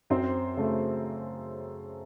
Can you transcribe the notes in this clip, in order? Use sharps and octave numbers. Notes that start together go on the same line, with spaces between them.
F#2 C4 C5
C#3 A3